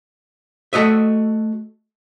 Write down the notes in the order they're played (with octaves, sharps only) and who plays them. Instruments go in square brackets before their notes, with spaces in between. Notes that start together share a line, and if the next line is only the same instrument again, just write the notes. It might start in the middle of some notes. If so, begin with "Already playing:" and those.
[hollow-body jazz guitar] A3 F#4 D#5 E5